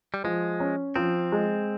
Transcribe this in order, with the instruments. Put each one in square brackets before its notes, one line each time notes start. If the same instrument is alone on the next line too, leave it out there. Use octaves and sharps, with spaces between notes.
[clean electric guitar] G3
[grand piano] F3 [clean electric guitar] G#3
[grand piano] C#4
[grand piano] F3 [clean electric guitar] C4
[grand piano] G#3